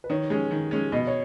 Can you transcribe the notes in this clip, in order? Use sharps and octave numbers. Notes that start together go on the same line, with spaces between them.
B4
D#3 C#5
G#3 C#4
D#3
G#3 C#4
B2 D#5
C#5